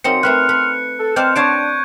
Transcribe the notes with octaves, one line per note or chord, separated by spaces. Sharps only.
F#2 C4 D#4 A#4 C#7
A3 C4 B4 C6 F6 F#6
B4
A4
C4 D5 D#5 A5 F6 G6
D4 C#5 F5 A5 C#6 G#6 D7